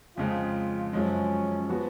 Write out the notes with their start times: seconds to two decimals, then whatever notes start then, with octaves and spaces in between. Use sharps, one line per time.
0.17 F2 C#3 G#3 F4
0.93 F#2 F3 G#3 C#4
1.69 F3 B3 F#4